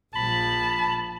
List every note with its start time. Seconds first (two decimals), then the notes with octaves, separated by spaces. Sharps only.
0.15 A#1 F3 A5 B5